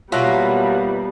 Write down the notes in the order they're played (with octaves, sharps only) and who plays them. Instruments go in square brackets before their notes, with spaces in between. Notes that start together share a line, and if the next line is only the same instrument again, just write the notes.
[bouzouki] B2 A#3 [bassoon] F#3 [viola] G3 B3 [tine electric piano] F4 E5 F#6